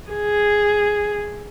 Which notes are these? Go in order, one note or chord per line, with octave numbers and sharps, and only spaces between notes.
G#4